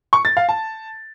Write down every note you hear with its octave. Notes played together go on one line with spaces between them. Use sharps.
C#6
A6
F5
A5